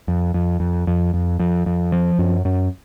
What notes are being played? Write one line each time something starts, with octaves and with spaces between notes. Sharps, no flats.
F2
F2
F2
F2
F2
F2
F2
F3
F#2
F#2